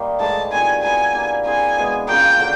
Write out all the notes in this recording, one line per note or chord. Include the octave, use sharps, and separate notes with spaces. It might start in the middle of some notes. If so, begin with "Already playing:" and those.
Already playing: D#3 G3 A#3 D#4 G4
A2 E3 G#3 A5
D#3 G3 C4 F4 G#5
F#3 B3 E4 G#5
A#3 D4 G4
C4 E4 G#4 C5 G#5
B2 G#3 B3
C#3 F3 A#3 G5
D3 F#3